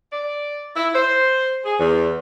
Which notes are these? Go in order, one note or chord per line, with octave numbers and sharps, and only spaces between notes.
D5
E4
C5
G#4
E2